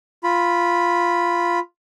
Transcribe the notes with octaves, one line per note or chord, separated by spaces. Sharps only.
F4 B5